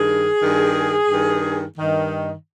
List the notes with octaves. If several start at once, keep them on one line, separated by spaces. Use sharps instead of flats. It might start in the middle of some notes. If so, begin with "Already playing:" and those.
Already playing: G2 D#3 G#4
G2 D#3
G2 D#3
G2 D#3